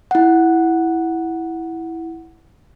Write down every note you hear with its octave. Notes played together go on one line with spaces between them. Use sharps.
E4 F#5